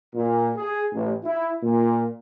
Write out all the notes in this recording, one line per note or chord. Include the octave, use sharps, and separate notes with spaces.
A#2
G#4
A1
E4
A#2